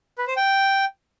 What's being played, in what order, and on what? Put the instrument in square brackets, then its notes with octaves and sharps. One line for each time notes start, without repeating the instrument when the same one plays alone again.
[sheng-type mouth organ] B4
C5
G5